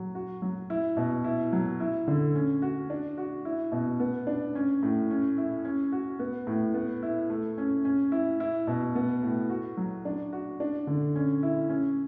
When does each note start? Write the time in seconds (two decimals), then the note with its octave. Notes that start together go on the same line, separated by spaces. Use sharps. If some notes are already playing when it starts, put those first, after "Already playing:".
Already playing: F#3
0.15 F#4
0.42 F#3
0.70 E4
0.97 B2
1.24 E4
1.53 F#3
1.80 E4
2.08 D3
2.35 C#4
2.62 F#4
2.90 D4
3.18 F#4
3.45 E4
3.72 B2
4.00 B3
4.27 D4
4.55 C#4
4.83 A2
5.10 C#4
5.38 E4
5.65 C#4
5.92 F#4
6.19 B3
6.47 A2
6.74 B3
7.03 E4
7.30 A3
7.58 C#4
7.85 C#4
8.12 E4
8.40 E4
8.67 B2
8.95 B3
9.23 A2
9.50 F#4
9.77 F#3
10.05 D4
10.33 F#4
10.60 D4
10.87 D3
11.16 C#4
11.43 E4
11.69 C#4